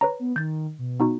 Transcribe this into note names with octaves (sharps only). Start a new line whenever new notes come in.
B4 C#5 A#5
B3
D#3 G6 A6
B2
B3 D#4 F#4